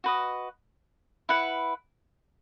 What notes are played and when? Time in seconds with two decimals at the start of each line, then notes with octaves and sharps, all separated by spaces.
0.04 F#4 B4 D#5
1.29 E4 B4 F#5